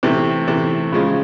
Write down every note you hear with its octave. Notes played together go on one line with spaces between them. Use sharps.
C3 E3 A3
C3 E3 A3
C#3 F3 G#3